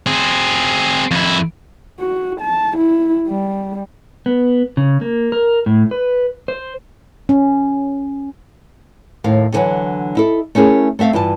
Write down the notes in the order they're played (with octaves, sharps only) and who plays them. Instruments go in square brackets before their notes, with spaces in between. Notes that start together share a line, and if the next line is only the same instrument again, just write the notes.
[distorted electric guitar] C4 G#4
F2 E4
[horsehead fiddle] F#4
A5
E4
G3
[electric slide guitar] B3
C#3
A#3
A#4
A2
B4
C5
[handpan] C#4
[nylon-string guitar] D#2 A2 F5
A2 D3 E3 F#3
D#4 E4 A4
A3 C#4 E4 G#4 A#4
A3 C4 E5 F5
G2 E3 F4 A5